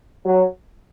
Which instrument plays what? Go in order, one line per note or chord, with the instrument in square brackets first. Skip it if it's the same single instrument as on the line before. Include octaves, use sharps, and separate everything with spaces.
[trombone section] F#3